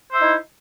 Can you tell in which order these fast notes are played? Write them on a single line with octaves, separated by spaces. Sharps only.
C5 E5 E4 D#4